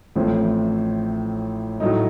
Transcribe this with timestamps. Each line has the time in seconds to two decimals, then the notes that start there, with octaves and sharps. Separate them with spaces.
0.16 A1 A2 F3 A3 C4
1.80 A2 F#3 A3 D#4